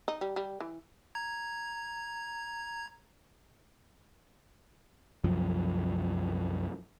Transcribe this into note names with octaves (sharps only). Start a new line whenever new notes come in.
D#4
G3
G3
E3
A#5 G#6
C2 F#2 F3